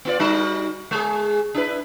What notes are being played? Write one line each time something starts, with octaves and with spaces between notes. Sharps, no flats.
B3 F4 D5
G3 D#4 F#4
G#3 G#4
D4 E4 B4